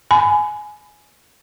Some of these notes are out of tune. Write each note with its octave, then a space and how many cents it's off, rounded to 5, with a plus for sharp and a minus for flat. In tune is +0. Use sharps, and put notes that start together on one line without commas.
G#5 +15 B5 +35